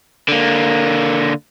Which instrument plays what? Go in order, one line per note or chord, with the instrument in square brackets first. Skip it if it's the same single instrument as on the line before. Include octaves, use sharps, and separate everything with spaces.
[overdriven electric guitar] D3 A#3